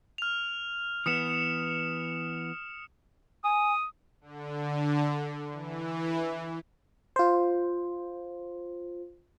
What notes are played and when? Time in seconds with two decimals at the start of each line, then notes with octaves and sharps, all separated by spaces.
0.18 F6 F7
1.06 E3 B3 D#6 C#7 E7
3.44 G#5 D#6
4.21 D3
5.52 E3
7.16 F4 C5